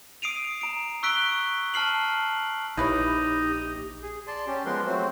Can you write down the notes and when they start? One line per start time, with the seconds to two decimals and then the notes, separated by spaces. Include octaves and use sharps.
0.22 D#6 C7 D7 D#7 F7
0.61 A#5 D7
1.03 C#6 E6 F#6 B6 D7 G7
1.74 A5 F6 C7 F#7
2.77 A#1 D#4 E4 G4 B4 C#5
4.02 G#4
4.27 D5 A5 C6
4.47 C#4 G4
4.66 F3 G#3 B3 A#4 B4 C6
4.86 F#3 A3 C4 F#4 C5